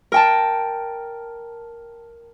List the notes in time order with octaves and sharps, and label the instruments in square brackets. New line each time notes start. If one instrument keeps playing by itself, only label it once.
[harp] A#4 G5 A5